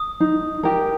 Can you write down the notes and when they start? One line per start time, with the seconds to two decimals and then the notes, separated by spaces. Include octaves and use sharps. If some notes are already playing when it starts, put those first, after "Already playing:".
Already playing: D#6
0.20 D#4
0.63 G4 A#4